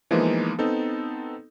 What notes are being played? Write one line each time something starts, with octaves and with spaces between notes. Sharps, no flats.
E3 F3 G#3 A#3 B3 D#4
B3 C4 D#4 A4